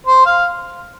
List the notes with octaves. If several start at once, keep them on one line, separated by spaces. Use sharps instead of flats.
C5
F5